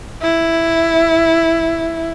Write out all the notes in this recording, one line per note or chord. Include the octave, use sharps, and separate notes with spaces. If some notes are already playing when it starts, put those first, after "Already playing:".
E4